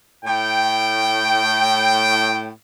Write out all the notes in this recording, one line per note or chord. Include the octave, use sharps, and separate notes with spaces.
A2 G5